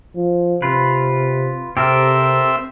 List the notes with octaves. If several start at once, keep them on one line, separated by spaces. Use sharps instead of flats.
F3
C3 F4 B4
C3 C4 G4 A4 A#4 E5